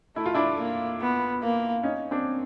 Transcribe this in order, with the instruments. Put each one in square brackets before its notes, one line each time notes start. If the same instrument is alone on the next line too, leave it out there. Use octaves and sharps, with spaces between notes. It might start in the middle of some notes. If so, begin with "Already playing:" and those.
[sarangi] A3 [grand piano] E4
[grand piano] F4
D4 E4
[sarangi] A#3
B3
A#3
[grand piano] C#4 D#4
C4 D4